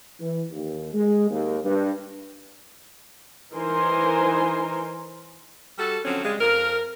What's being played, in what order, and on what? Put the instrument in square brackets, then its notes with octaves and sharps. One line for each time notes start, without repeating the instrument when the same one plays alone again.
[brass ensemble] E3
D#2
G#3
D#2
G2
[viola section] E3 D#4 A#4 C5 G#5 C6
[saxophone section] G3 F#4 A4
D3 F3 F#3 C4 C#4
C#3 G3 G#3
F2 A#4